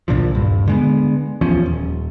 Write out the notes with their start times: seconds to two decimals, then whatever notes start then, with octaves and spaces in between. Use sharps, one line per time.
0.08 C2 A#2 D3 F3
0.35 D#1 G2
0.68 D3 G#3 B3
1.41 D#1 E2 F3 C#4
1.66 D#1